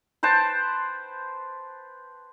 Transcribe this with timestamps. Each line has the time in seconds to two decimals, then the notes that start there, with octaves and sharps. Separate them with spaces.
0.23 B4 C5 G5 A5